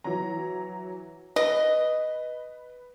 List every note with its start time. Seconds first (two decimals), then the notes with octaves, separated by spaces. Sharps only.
0.04 E3 F#3 A#5
1.36 B4 D#5